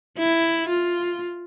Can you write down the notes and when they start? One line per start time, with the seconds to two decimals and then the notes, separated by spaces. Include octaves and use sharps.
0.18 E4
0.69 F4